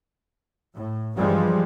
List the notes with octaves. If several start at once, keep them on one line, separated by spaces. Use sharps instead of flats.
A2
G2 E3 F3 G3 G#3